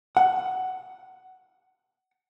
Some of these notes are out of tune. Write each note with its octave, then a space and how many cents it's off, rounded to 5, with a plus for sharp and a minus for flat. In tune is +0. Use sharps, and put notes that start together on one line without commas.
F#5 +15